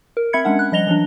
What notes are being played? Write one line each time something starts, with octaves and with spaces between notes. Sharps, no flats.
A#4
C4 E5 B5 G#6 C#7
G#3 C#4 D4 F#5
F#6
F3 G3 D#5 A#6 F7 G7
E3 F#3 D4